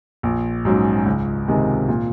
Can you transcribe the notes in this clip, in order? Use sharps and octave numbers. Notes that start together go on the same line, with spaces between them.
A#1
G#2 F#3 C#4
C#2
C3 D#3 G#3
A#2